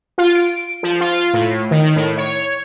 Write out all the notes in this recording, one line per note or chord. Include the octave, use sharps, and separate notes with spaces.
F4
D7
F3
F4
A2
D#3
A2
C#5